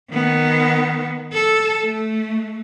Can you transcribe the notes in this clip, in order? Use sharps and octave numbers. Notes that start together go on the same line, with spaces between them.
D#3 B3
A4
A3